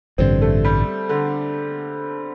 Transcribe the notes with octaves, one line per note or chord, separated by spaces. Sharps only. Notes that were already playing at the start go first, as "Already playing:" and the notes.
A1 G2 D3 C4
A3
G3
D3